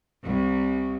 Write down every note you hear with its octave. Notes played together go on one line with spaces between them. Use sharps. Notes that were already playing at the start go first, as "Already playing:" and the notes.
C2